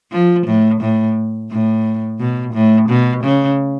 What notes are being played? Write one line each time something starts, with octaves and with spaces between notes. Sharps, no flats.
F3
A2
A2
A2
B2
A2
B2
C#3